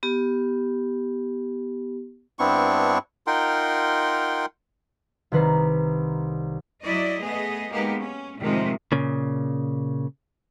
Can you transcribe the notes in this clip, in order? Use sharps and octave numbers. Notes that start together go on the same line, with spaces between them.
B3 G4
G2 B3 C4 D4 E4 C#6
D#4 F4 A#4 F#5 G5 C6
C2 D#3 B4 A#5 C7
F#3 E4 D5 D#5
A3 B3 G#4 D#5
G#3 A#3 B3 D#4 G4 G#4
C#4
A2 C3 D#3 F3 G#3
A#2 C#3